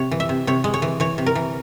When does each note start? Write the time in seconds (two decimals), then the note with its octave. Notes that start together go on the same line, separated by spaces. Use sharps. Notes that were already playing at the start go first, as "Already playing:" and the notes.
Already playing: C3 C#5
0.11 E3
0.20 E5
0.29 C3
0.47 C3 C#5
0.64 G#3
0.74 C#5
0.82 E3
1.00 E3 C#5
1.18 C3
1.26 A#4
1.35 E3